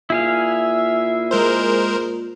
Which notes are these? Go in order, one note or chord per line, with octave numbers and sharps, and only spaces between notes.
A#2 E4 G#4 E5 F5
G#3 A#4 C5